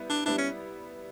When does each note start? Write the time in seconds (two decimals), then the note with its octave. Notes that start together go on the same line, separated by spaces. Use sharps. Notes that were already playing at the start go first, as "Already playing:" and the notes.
Already playing: G3 B3 E4
0.10 D4
0.26 G3 B3 D4 E4
0.38 C#4